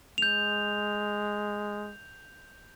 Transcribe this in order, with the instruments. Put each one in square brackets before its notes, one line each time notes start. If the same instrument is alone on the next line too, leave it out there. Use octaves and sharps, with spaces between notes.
[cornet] G#3 [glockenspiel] G6 F7